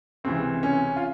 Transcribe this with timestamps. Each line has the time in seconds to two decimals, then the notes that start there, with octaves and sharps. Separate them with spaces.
0.24 C#2 C3 E3 C4
0.63 C#4
0.96 F4